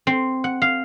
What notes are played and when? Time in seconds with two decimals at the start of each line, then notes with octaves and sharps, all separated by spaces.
0.07 C4
0.44 F#5
0.62 F5